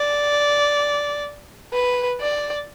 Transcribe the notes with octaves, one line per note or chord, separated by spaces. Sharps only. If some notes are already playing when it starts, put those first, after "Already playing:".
Already playing: D5
B4
D5